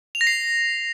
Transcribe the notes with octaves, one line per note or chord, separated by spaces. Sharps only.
F7
A#6
C7